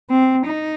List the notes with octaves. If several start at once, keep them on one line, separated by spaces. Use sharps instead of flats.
C4
D#4